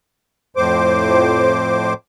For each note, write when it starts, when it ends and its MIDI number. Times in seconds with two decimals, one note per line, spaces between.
0.56 1.94 41
0.56 1.94 45
0.56 1.94 72
0.56 1.94 86